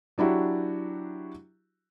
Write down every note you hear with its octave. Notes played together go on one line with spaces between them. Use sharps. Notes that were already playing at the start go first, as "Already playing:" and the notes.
F#3 D4 E4 F#4 G4